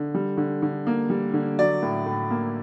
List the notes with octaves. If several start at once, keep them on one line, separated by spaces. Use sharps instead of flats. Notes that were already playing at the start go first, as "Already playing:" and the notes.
Already playing: D3
G3
D3
D3
A#3
G3
D3
F#3 D5
A2
A2
A#3